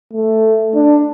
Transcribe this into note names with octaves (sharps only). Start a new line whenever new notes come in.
A3
D4